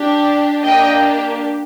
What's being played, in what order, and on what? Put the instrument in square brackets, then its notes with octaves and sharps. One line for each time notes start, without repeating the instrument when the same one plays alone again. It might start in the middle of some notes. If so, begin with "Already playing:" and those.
Already playing: [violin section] D4 G4
A#3 D4 G4 D#5 G5